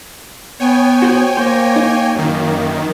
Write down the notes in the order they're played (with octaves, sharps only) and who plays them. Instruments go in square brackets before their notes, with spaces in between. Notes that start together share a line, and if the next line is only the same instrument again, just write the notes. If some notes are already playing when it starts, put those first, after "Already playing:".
[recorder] B3 [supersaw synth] C#5 G5 G#5
[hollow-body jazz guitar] F#4 C5
[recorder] A#3 [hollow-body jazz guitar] C5
[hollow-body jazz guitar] D#4
[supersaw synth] F#2 D#3